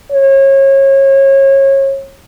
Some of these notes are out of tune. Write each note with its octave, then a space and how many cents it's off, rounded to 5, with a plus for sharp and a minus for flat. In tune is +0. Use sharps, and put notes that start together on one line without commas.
C#5 -30